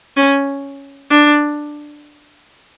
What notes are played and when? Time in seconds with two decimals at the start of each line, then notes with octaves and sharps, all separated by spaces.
0.17 C#4
1.10 D4